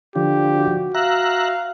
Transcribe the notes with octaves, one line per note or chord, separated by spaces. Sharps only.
D3 F3 G4
F#4
E5 F5 A#5 F#6